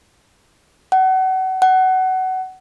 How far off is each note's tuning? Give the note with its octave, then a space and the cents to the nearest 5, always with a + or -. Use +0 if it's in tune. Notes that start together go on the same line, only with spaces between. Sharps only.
F#5 +30
F#5 +20